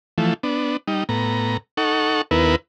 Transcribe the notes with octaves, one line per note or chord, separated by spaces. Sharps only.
E3 F3 A3
B3 D4
G3 D#4
A2 B3 A#5
D#4 A4 F#5 C#6
D#2 B3 E4 A#4 B4